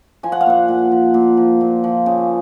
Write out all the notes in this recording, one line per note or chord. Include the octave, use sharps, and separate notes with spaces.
F3 G#5
F#5
F5
A#2 F#5
A#2
F3
A#2
F3
A#2
F3
C#3